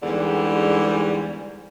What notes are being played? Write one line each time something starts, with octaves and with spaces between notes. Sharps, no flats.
E2 G#2 D3 G3